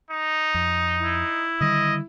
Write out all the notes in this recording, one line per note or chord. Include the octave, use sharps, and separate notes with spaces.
D#4
F2
E4
D3 D#3 G3 D#5